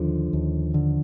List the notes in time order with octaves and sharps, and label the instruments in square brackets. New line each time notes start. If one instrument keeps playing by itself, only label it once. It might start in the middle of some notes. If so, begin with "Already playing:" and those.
Already playing: [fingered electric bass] D#2 D3 F3
D#2
D3